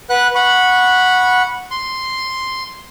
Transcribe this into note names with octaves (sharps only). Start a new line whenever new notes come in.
B4 F#5 F#6
F#5 B5 C#6
C6